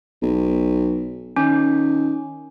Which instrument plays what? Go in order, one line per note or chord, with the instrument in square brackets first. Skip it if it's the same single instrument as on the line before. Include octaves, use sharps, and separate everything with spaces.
[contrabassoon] B1
[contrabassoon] D#3 [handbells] C#4